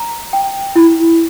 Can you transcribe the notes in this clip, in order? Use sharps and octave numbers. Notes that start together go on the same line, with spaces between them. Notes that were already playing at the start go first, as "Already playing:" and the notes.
Already playing: A#5
G5
E4